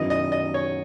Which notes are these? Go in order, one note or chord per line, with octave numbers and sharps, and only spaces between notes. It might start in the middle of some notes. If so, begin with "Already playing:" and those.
Already playing: F#2 D#3 F#3 B3 E4 D#5
D#5
D#5
C#5